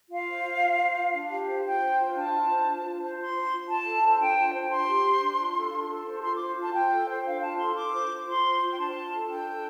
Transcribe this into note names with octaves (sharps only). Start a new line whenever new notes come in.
F4 F5
C5
F4
F4
C5
F4
D4
G4
C5
F4 G5
C5
F4
D4 A5
F4
C5
D4
F4
C5
F4 C6
C5
F4
F4 A5
A4
C5
A5
D4 G5
F4
C5
A5
D4 C6
G4
C5
D4
F4
A4
D4
A4
C5
F4 C6
D6
C5
F4 A5
F4 G5
A4
C5
D4 F5
F4 A5
A4 C6
F4 D6
C5
F4
F4 C6
C5
F4
G5
D4 A5
F4
A4
D4 G5
A4